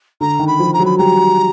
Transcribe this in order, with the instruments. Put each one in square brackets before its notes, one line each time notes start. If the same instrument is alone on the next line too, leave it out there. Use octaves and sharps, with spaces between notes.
[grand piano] D3 [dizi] A#5
[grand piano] D#3
[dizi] B5
[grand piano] F3
[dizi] A#5
[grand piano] F#3
[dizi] B5
[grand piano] G3 [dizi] A#5